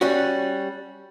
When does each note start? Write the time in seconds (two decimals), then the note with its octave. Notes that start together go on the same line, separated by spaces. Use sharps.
0.01 G3 C#4 F#4